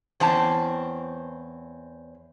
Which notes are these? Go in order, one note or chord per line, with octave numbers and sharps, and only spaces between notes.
E2 C4 C#4 A5